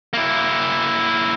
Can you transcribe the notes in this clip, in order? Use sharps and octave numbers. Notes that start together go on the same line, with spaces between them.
A#3 E4